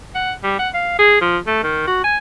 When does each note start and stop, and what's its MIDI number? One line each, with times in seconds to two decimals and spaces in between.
0.15 0.32 78
0.43 0.58 55
0.59 0.69 78
0.74 0.98 77
0.99 1.20 68
1.21 1.38 53
1.47 1.63 57
1.63 1.85 51
1.87 2.04 66
2.04 2.17 80